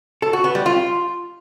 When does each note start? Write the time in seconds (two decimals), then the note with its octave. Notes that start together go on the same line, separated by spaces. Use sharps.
0.22 A4
0.33 F#4
0.44 B3
0.55 G3
0.66 F4